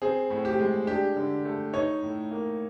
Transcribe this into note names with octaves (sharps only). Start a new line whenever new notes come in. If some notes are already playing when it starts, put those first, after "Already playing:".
C4 G#4
A2
G4
G#3
D4 G4
D3
A3
D#4 C#5
A2
A#3